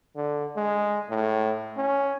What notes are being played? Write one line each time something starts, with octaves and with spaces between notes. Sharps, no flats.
D3
G#3
A2
C#4